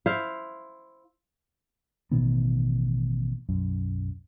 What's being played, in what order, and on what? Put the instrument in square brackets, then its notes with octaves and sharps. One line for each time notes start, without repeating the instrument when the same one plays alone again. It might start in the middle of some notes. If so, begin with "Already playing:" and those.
[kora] E4 C5 F5
[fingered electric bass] A1 B2 D#3 B3
B1 F#2